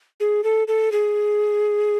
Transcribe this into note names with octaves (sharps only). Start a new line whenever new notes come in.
G#4
A4
A4
G#4